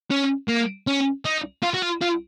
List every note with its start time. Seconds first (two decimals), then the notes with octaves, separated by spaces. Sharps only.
0.11 C#4
0.49 A#3
0.87 C#4
1.25 D#4
1.63 F4
1.74 F#4
1.82 F4
2.01 F4